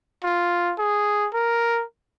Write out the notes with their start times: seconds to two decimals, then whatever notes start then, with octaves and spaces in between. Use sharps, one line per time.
0.24 F4
0.78 G#4
1.34 A#4